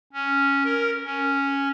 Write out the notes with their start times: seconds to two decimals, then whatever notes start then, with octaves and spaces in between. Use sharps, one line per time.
0.13 C#4
0.64 A#4
1.05 C#4